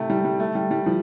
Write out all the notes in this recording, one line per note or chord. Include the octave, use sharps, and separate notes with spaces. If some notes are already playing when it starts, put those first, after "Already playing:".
Already playing: C3 A3
G3
G3
A3
G3
G3
F3